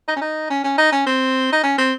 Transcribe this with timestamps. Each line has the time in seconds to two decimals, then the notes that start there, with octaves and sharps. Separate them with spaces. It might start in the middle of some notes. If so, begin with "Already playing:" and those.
0.08 D#4
0.16 C#4
0.21 D#4
0.50 C#4
0.64 C#4
0.78 D#4
0.92 C#4
1.06 C4
1.53 D#4
1.63 C#4
1.78 C4